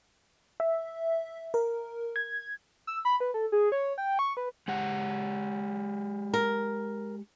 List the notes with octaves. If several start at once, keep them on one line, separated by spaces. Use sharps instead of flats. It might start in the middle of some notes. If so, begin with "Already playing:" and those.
E5
A#4
G#6
E6
B5
B4
A4
G#4
C#5
G5
C#6
B4
G#3 G4 F#5
A#4